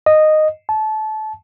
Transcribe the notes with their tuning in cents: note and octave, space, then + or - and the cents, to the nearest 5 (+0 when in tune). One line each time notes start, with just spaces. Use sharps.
D#5 -10
A5 -25